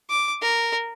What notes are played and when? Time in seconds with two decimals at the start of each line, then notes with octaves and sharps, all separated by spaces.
0.10 D6
0.42 A#4